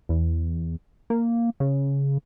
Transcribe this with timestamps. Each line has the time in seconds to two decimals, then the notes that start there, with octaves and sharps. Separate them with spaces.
0.09 E2
1.10 A#3
1.60 C#3